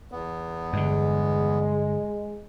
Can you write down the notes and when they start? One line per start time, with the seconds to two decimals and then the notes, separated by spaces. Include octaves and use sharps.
0.12 E2 B3
0.73 G2 D3 G#3